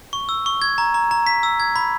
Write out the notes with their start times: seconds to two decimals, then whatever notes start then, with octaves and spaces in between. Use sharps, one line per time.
0.13 C#6
0.29 E6
0.46 C#6
0.62 G#6
0.78 A#5
0.94 A#5
1.11 A#5
1.27 B6
1.43 E6
1.60 G#6
1.76 B5